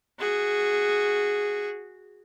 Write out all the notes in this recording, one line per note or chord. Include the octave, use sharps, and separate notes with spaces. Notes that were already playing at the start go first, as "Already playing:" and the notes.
F#4 G#4